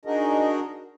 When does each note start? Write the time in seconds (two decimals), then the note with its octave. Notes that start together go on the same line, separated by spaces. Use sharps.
0.05 D4 D#4 F#4 G#4 A#4 D#5